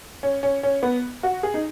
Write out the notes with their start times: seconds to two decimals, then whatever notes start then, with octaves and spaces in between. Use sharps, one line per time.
0.23 C#4
0.43 C#4
0.63 C#4
0.83 B3
1.23 F#4
1.43 G#4
1.54 D#4